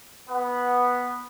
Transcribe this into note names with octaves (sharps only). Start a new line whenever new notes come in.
B3